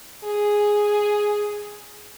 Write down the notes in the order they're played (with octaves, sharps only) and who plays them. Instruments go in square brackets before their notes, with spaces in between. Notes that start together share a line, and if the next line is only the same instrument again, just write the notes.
[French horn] G#4